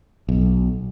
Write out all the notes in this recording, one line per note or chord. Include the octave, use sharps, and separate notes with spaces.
B1